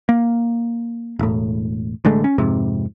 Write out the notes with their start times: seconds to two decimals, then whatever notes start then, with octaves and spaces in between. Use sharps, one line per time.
0.09 A#3
1.19 E1 A2
2.05 A1 D3 G#3 A3
2.24 C#4
2.38 F2 G#2 C3